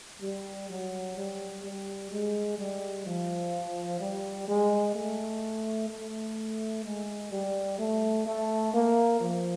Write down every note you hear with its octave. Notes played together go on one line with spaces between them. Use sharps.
G3
F#3
G3
G3
G#3
G3
F3
G3
G#3
A3
A3
G#3
G3
A3
A3
A#3
F3